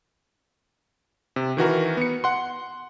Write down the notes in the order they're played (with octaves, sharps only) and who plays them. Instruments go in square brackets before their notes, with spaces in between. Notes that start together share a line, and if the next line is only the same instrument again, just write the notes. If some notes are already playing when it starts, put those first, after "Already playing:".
[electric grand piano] C3
D#3 E3 F#4 A#4
B3 C#7
F#5 C6